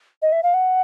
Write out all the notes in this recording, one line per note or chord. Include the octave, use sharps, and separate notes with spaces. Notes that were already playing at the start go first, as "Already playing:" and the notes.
D#5
E5
F5
F#5